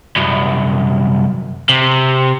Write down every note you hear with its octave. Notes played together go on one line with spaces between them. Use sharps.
C2 F#2
C3